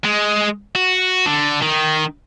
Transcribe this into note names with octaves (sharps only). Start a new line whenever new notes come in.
G#3
F#4
D3
D#3